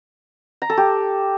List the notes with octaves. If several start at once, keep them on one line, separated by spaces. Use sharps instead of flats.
A#5
A4
G4